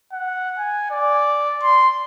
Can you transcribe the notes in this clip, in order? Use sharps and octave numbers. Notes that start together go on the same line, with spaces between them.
F#5
G#5
D5
C6